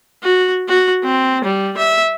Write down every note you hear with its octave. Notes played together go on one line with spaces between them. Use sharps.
F#4
F#4
C4
G3
E5